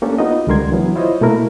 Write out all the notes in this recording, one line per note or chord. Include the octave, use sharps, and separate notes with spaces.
A#3 C#4 D4 G4 A4
B3 D#4 F4 F#4 D#5
C#2 D3 G3 A#4 C6 G#6
E3 F#3 B3
E4 F4 C5 C#5 D#5
B2 A3 A#3 E4 A#4